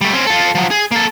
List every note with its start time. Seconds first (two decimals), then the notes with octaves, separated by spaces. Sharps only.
0.01 G3 A3
0.13 C4 C#4
0.27 F4 A4
0.55 F3 F#3
0.71 G#4
0.91 A#3 A4